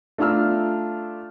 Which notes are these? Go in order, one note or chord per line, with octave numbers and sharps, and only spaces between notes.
A3 D4 F4 A#5 E6 F6